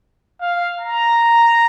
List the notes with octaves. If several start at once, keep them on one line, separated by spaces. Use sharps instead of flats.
F5
A#5